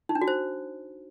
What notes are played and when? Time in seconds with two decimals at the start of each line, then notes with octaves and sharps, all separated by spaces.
0.09 D#4
0.15 D4
0.21 F#4
0.28 C5